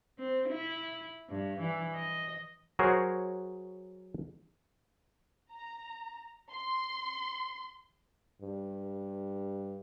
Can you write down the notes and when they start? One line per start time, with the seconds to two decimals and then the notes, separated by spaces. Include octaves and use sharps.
0.19 C4
0.49 E4
1.30 G2
1.60 E3
1.95 D#5
2.79 F#3 F#4 G#4 A#4 C5 C#5
5.51 A#5
6.50 C6
8.42 G2